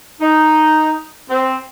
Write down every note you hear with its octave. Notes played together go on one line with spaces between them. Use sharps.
D#4
C4